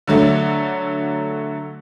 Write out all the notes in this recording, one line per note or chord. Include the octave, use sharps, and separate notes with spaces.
D3 F#3 A3